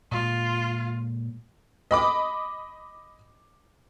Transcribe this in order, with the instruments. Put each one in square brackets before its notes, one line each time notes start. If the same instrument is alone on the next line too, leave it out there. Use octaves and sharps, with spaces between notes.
[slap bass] A#2 G#3 [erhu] F4
[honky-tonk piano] D#5 B5 D6